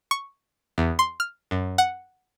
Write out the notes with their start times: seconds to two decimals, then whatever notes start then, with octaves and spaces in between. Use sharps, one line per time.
0.11 C#6
0.78 E2
0.99 C6
1.20 F6
1.51 F#2
1.78 F#5